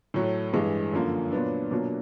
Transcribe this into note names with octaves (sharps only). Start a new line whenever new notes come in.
A2 F#3 A3
G2 E3 G#3
F#2 D3 F3 A#3
A#2 F#3 B3 D4
B2 F#3 A#3 D4 F4